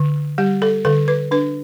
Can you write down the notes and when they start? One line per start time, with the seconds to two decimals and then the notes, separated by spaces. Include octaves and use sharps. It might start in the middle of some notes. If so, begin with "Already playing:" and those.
Already playing: D3
0.38 G3 G4
0.62 A4
0.85 D3 A4
1.08 B4
1.31 D4 B4